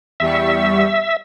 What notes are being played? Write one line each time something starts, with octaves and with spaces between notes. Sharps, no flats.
E2 G3 E5 C#6